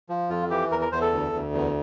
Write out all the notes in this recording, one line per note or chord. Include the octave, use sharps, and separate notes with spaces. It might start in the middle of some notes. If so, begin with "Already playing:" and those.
F3
F2 F4
E3 G4
E2 A#4
A#4
E2 C5
A4
D2
D2
E2